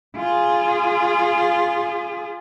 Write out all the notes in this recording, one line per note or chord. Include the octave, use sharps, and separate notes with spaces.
F4 G#4